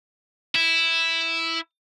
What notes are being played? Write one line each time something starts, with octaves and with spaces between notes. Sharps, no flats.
E4